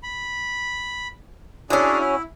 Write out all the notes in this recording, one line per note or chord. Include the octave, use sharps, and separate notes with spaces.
B5
C#4 D4 E4 F#4 G#4
E4